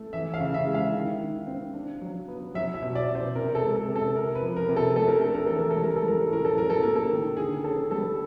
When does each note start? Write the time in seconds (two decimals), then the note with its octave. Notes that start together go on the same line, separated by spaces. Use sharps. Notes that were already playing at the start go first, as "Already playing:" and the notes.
Already playing: A3
0.13 E3 E5
0.34 F5
0.41 C#3
0.54 E5
0.67 G#3
0.74 F5
0.94 D#3
1.20 D#3
1.47 C4
1.74 D4
2.02 F#3
2.28 B3
2.54 F#3 E5
2.74 E5
2.82 B2
2.95 D5
3.09 B2
3.15 C5
3.35 C3 A#4
3.55 A4
3.62 G#3
3.76 A4
3.88 C3
3.96 A4
4.15 C3 A#4
4.35 B4
4.42 F3
4.56 A#4
4.69 C3
4.76 A4
4.96 A3 A4
5.08 A#4
5.21 D4 A4
5.34 A#4
5.46 E3 A4
5.59 A#4
5.70 A4
5.76 G3
5.83 A#4
5.96 A4
6.03 G3 A#4
6.21 A4
6.30 A2 A#4
6.45 A4
6.57 F#3 A#4
6.70 A4
6.83 A#3 A#4
6.96 A4
7.11 D#3
7.37 D3 G#4
7.64 C#4 A4
7.91 G3 A4